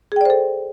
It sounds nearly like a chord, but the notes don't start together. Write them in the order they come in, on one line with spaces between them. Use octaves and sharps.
G#4 G5 D5 C5 A4